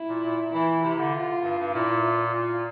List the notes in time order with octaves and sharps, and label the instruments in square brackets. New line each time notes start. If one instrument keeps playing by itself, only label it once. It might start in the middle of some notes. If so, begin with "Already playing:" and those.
Already playing: [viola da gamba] E4
[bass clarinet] A#2
A#2
[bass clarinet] E3 [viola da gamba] E4
[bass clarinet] C3 [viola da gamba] E4
[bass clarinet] D3
[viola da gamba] F4
[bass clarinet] G2
G2
[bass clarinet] A#2 [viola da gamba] E4
[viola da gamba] F4
[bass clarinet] A#2